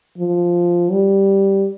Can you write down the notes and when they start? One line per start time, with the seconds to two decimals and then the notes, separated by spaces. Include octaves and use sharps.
0.18 F3
0.92 G3